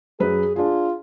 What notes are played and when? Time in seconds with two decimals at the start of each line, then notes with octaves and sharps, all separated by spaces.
0.20 F#2 G#4 B4
0.56 D4 F4 G#4